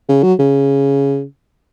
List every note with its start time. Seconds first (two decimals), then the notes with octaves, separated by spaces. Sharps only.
0.09 C#3
0.23 F#3
0.39 C#3